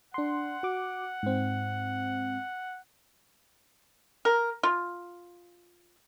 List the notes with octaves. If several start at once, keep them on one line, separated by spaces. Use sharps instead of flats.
D4 F#5 C6
F#4 D6
G#2 C4
A#4
F4